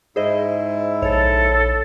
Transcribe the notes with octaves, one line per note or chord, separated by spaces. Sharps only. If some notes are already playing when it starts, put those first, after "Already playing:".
G#2 E4 G#4 C5 D#5
A#1 A4 C#5